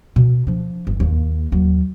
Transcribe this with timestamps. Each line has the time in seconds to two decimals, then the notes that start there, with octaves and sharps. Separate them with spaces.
0.16 B2
0.47 F3 D4
0.87 G1
1.00 D#2 A#3
1.52 D#2 F#3